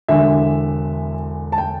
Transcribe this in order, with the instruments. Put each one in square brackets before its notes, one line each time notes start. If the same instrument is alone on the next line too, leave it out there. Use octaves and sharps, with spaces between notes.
[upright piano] E1 E2 D3 E5
A5
G5